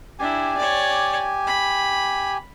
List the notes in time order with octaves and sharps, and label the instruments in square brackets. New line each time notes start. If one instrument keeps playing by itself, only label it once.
[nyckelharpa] D4 E4 [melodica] G4 G#5
[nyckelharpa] C#5 D5
B5